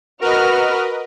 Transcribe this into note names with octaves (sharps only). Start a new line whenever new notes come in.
F#4 A#4 B4 D#5 F#5 F6